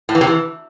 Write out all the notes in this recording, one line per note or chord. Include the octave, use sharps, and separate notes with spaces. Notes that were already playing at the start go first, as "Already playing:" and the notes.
A2
E3
C3
E3